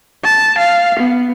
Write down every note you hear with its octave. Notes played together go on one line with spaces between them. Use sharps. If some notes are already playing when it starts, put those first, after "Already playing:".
A5
F5
B3